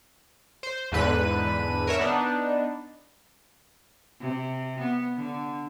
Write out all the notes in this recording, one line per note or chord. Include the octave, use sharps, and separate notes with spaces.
C5
E2 G#2 D3 B4 D#7
A#4 C#5 E5
B3 D4 D#4
C3
B3
D3